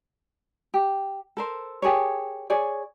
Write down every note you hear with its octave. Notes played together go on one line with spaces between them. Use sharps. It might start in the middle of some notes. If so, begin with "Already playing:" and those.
G4
A4 A#4 C5
G4 G#4 A#4 C#5
G#4 C#5 D5